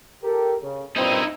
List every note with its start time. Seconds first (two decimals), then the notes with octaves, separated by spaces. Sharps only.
0.24 G4 A4 A#4
0.62 C#3
0.96 G2 A#2 C4 D#4 E4